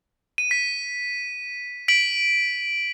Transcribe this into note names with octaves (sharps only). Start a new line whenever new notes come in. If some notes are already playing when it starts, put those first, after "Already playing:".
D#7
B6
B6 D7 F#7